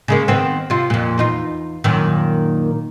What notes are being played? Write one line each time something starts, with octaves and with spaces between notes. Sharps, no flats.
C#3 G#3 A#3
D#3 B3 C4
C3 F4
F2 A#2
E2 D#4 F4
F#2 A#2 D#3